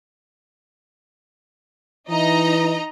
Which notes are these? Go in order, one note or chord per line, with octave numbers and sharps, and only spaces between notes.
E3 D#4 D#5 A#5